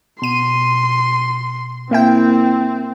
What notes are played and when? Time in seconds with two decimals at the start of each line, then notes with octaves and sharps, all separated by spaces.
0.22 B2 C6 D#7
1.91 A#3 C4 E4 G5